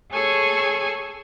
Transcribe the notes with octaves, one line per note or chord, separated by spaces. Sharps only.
G#4 A4 C#5 G#5 A5 C#6